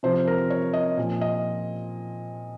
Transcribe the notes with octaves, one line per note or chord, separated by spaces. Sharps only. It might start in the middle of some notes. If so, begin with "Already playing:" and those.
C3 F3 C5
A#4
C#5
D#5
A#2 F3
D#5